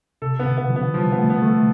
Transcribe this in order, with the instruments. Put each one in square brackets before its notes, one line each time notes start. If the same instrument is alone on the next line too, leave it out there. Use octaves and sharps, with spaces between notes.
[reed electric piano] C3 [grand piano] A4
[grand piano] B3
[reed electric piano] B2 D3
[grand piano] B3
[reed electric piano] D3 F3
[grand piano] B3
[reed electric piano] E3 G3 [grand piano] F3
[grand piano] B3
[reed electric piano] F3 A3
[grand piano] B3
[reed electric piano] F3 A3
[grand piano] A4